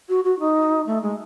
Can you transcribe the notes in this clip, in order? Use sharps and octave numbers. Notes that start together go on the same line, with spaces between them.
F#4
F#4
D#4
A3
G#3